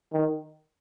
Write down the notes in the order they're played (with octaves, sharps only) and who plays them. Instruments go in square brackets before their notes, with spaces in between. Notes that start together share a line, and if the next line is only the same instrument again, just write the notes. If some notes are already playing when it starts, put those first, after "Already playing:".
[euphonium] D#3